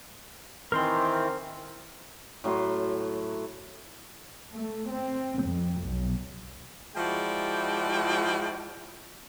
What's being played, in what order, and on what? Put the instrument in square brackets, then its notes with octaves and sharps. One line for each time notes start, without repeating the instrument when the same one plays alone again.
[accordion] D#3 E3 C4 [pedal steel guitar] A#4 C5 C6
[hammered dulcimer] A2 F#3 E4 C6
[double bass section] A3
C4
F2
B1
[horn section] F3 G#3 E4 F#4 D5 G5